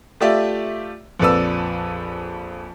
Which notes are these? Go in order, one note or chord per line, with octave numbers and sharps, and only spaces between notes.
A3 F4 G4 D5 E5
A#1 F2 A4 B4 D5 E6